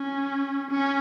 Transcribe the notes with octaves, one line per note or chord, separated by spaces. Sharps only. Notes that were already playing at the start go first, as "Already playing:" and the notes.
Already playing: C#4
C#4